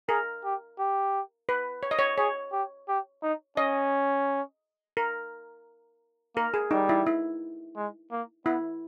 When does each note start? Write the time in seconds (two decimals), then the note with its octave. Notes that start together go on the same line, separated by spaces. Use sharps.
0.09 G#4 A#4
0.44 G4
0.79 G4
1.49 B4
1.83 C#5
1.91 D#5
1.99 C#5
2.18 G#4 C#5
2.52 G4
2.88 G4
3.22 D#4
3.57 C#4 D#5
4.97 A#4
6.36 A#3 A#4
6.54 G#4
6.71 G3 D#4
6.89 E4
7.07 E4
7.76 G#3
8.11 A#3
8.46 B3 E4